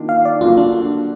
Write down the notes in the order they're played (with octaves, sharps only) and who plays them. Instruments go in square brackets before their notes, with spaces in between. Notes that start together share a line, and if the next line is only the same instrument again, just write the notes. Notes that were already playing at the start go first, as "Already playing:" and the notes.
Already playing: [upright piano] D#3 A#3 D4 F4
[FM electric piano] F5
D5
[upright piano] D3 F#3 A#3 [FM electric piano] F4
[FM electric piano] D4